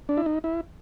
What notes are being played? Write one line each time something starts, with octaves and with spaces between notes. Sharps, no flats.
D4
E4
D#4
E4